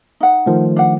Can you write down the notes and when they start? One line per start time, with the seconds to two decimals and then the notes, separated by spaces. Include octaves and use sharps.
0.21 D#4 F#5
0.46 D#3 F3 A3
0.76 D4 F#5